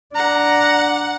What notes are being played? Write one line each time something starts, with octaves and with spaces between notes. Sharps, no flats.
D4 F#5 A#5